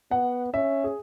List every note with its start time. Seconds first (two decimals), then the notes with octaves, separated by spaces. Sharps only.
0.11 B3 F#5
0.54 C#4 E5
0.84 G#4